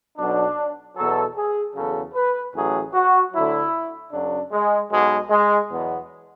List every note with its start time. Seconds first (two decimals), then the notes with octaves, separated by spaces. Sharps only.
0.16 B1 B2 F#3 D4
0.95 E2 B2 F#3 A4
1.34 G#4
1.74 E2 C#3 F#3 A4
2.13 B4
2.53 A1 A2 F#3 G#4
2.92 F#4
3.31 D2 D3 F#3 E4
4.11 F#2 C#3 F#3 D4
4.51 G#3
4.90 B1 B2 F#3 G#3
5.29 G#3
5.69 E2 B2 F#3 B3